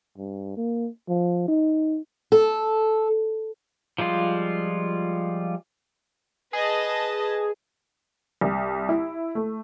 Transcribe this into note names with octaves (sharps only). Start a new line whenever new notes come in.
G2
A#3
F3
D#4
A4
F3 G3 G#3 F4
G#4 B4 D#5 A5
C2
E4
A3